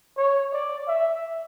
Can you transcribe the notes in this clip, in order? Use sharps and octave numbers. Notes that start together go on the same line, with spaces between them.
C#5
D5
E5